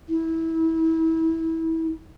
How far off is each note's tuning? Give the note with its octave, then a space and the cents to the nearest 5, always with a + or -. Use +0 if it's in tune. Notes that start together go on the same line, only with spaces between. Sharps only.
E4 -25